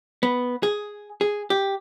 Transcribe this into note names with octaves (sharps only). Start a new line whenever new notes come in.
B3
G#4
G#4
G4